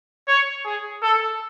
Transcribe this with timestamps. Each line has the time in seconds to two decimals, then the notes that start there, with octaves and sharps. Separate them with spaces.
0.28 C#5
0.65 G#4
1.02 A4